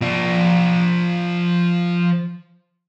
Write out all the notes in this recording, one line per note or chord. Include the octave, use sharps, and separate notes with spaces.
F3 D5